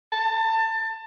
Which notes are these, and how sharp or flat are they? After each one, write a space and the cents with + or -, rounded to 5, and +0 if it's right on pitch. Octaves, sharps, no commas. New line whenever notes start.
A5 +25